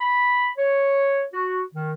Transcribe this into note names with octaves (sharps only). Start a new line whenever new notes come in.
B5
C#5
F#4
D#3